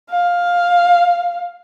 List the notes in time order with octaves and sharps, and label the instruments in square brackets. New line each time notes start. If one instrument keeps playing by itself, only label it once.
[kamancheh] F5